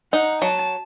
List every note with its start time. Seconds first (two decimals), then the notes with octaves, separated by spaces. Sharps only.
0.12 D#4 F#5
0.42 F#3 A5